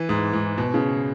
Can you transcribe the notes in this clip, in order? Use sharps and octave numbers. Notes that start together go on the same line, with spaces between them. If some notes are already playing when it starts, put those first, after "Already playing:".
Already playing: E3
G#2
G#2
B2
C#3